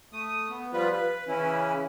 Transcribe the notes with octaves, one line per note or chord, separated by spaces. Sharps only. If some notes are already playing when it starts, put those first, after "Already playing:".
A3 D#6
B3
F3 G3 F4 B4
B4
C#3 E3 C#4 E4